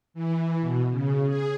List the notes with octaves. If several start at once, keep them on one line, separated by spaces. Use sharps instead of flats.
E3
B2
C#3
G#4